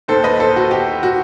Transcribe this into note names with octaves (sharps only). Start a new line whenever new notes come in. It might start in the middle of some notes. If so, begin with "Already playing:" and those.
D#2 D#3 A4 C5
B4 D#5
A4 C5
F#4
G4
F#4